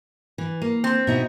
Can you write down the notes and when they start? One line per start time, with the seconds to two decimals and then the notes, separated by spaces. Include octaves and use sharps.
0.38 E3
0.62 A#3
0.84 C4
1.07 B2 D#4 E4